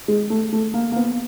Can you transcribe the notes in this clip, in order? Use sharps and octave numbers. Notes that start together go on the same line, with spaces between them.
G#3
A3
A3
A#3
A#3
B3